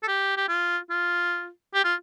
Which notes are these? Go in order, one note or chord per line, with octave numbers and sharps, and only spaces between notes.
A4
G4
G4
F4
F4
G4
F4